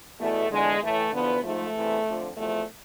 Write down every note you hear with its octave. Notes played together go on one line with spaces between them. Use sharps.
E2 B2 A3
E2 D3 F3 G#3
A2 E3 A3
E2 D3 F3 B3
G#2 F3 A3
E2 C3 E3
F2 D3 F3
E2 C3 F3 A3